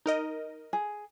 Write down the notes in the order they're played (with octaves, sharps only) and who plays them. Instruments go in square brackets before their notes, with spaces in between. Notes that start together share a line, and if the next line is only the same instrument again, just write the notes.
[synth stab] D#4 A#4 D#5
[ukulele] G#4